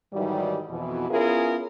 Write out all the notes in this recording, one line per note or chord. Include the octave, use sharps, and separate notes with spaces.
G#2 D#3 E3 F#3 G3
F2 B2 E3
B3 C#4 E4 F4 G#4 A#4